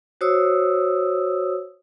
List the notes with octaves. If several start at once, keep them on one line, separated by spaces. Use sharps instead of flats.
F#4 C5 C#5 D#6 E6